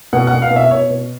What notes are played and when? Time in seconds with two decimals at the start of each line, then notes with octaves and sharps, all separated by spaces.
0.13 B2 F#5
0.27 F#5
0.33 B2
0.42 F5
0.51 B2
0.56 E5
0.70 B2 C#5
0.90 B2